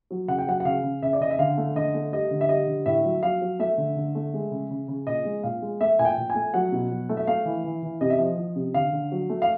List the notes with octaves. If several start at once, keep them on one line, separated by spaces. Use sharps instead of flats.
F#3
C#3 F#5
G5
F#3 F#5
F#5
C#3 F5
C#3
C#3 E5
D5
C#3 D#5
E5
D3 F5
A3
D3 D#5
A3
G3 D#5
D3
E5
G3 D#5
D3
A2 E5
F#3
F#3 F5
F#3
A3 E5
D3
D3
A3
G#3
C#3
C#3
C#3
A#2 D#5
G#3
A#2 F5
G#3
A3 E5
A#2 G#5
G5
A#2
G#5
A3
F#3 F#5
B2
F#3
A3
E5
A3 F5
E3
E3
E3
C3 D#5
E5
F3 D#5
F3
C3
D3 F5
D3
F#3
A3
F5